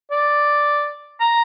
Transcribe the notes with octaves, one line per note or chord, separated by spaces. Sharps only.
D5
A#5